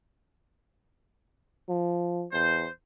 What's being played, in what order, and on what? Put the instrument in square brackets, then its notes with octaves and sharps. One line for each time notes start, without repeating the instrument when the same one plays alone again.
[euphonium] F3
[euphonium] E2 [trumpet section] C5